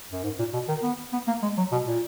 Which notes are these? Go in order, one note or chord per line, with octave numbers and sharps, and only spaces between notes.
F#2
G#2
A#2
B2
D#3
B3
B3
A#3
G#3
F#3
B2
A#2